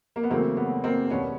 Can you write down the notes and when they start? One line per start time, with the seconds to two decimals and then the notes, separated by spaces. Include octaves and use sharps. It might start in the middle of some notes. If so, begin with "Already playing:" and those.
0.16 A#3
0.23 B3
0.30 E2 C#3 F#3 A3 A#3 C4
0.57 B3
0.84 A#3 C4
1.10 E1 D#2 D#3 B3 C#4